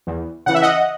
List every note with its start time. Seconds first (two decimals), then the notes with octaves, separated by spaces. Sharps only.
0.07 E2
0.46 C#3 E3 F#5
0.54 E5
0.62 D#5 F#5